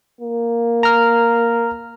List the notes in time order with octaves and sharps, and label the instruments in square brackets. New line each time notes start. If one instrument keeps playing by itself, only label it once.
[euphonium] A#3
[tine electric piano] A#5 F6